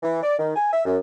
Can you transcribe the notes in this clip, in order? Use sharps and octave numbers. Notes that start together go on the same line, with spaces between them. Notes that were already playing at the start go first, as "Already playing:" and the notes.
E3
D5
D#3
G#5
E5
F#2